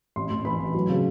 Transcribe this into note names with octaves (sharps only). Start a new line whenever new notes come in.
A1 C6
A1 C6
E3 B5
A1
F#3
C#3